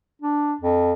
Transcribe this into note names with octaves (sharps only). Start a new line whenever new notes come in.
D4
F2